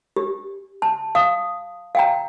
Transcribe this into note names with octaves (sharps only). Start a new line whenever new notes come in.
G4
A5
F5 D#6
F5 G5 A#5